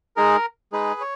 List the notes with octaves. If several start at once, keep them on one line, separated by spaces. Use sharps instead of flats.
G#3 D#4 G#4 A#4
G#3 D#4 G#4 B4
C#5